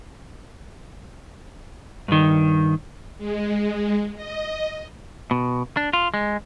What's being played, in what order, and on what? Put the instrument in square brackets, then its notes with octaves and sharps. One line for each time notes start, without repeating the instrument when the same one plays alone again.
[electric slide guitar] G2 D#3
[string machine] G#3
D#5
[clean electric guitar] B2
D4
F4
G#3